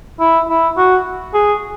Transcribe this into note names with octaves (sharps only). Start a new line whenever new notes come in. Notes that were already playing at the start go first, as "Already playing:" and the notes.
E4
E4
F#4
G#4